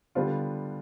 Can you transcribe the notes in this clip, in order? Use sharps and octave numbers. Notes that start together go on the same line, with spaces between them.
D3 G3 B3 D4 F4